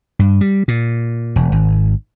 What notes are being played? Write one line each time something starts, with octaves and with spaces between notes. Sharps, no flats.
G2
G3
A#2
E1
G#1